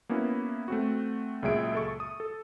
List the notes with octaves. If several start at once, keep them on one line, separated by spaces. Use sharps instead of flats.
A#3 B3 C#4 E4 F#4
A3 C4 F#4
C#2 A#2 F#3 G#4 E5 D7
A4 C#6
D#6
A4